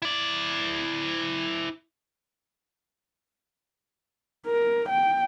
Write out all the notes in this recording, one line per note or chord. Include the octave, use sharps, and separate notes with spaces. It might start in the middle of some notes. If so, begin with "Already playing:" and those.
E4 D5
A#4
G5